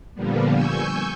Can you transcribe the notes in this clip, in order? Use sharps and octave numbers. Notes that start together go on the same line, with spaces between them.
A#2 D3 F3 G3 A#3 B3
G#5 C#6 E6 G6